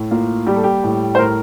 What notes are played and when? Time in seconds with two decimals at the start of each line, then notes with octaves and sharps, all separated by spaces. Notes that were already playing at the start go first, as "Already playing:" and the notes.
Already playing: A2
0.11 A#3 F4
0.47 G3 G4
0.56 A4
0.64 G4
0.84 A2
1.15 C5
1.19 A2 A#4